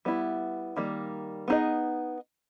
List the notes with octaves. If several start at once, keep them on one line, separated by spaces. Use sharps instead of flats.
G3 B3 E4
D#3 G3 A#3
B3 D#4 G#4 D#5